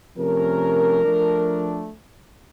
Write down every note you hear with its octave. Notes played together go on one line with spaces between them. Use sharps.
C3 F3 A3 C#4 A#4
F3 A3 D4